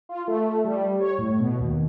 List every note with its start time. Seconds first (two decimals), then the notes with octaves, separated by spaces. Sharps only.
0.09 F4
0.28 A3
0.65 G3
1.00 C#5
1.18 A2
1.40 B2
1.60 D#2